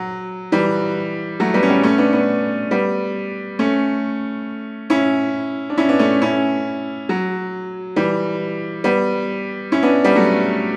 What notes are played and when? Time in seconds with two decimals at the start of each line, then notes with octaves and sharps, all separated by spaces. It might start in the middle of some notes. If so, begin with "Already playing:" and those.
Already playing: F#3
0.52 E3 G3
1.40 F#3 A3
1.54 G3 B3
1.63 C#4
1.69 G3 B3
1.83 A3 C#4
1.98 B3 D4
2.13 B3 D4
2.71 G3 B3
3.59 A3 C#4
4.90 C#4 E4
5.70 D4
5.78 C#4 E4
5.89 B3 D4
5.99 A3 C#4
6.22 C#4 E4
7.09 F#3
7.96 E3 G3
8.84 G3 B3
9.72 C#4 E4
9.83 B3 D4
10.04 G3 B3
10.15 F#3 A3